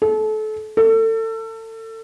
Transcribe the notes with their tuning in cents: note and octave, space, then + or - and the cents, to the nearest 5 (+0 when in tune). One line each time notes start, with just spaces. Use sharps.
A4 -30
A4 +30